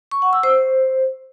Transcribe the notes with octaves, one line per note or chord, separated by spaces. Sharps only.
C#6
F#5
E6
C5